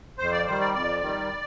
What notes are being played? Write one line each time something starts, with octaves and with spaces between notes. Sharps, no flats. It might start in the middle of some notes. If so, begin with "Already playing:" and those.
F2 C5
D5
D#3 G3 C5
D5
F2 D5
D#3 G3